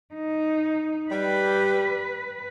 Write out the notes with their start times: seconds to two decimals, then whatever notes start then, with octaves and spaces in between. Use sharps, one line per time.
0.15 D#4
1.11 G3 B4